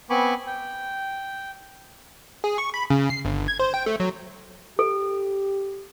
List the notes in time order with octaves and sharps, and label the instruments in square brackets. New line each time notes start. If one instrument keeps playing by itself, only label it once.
[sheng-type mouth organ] B3 C4 G#5 B5 C#6 D6
G5
[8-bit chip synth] G#4
C#6
B5
C#3
C7
G1
G#6
C5
G5
A3
F#3
[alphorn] G4 [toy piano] A4